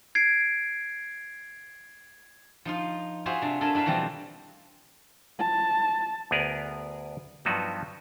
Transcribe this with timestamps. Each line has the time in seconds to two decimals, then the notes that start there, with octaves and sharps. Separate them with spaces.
0.15 G#6 C7 D7
2.65 F3 D#4 F4
3.26 F4 F#4 G#4 C5 E5
3.42 C3 D4
3.61 D4 A4 A#4 E5 G#5
3.75 D4 E4 B4 E5 F5
3.86 B2 E3 F3 G3 C4
5.39 A5
6.31 D2 B3 G#4 A#4 D5
7.45 G2 F3 F#3 B3 D#4 F#4